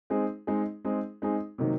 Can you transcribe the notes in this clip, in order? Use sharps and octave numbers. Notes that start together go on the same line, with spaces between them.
G#3 C4 D#4 G#4
G#3 C4 D#4 G#4
G#3 C4 D#4 G#4
G#3 C4 D#4 G#4
C3 D#3 F#3 A#3 D#4